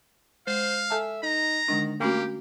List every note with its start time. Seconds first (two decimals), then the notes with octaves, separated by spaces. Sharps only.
0.47 G#3 C5 F5
0.90 A4 E5 G#5 A5
1.23 D#4 A#5
1.68 D3 D#3 G#3 D4
2.00 A3 A#3 C#4 F#4 G4